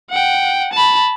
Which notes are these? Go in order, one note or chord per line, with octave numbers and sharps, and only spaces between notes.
F#5 G5
A5 B5